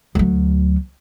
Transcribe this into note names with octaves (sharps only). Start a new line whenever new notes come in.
D2 F#3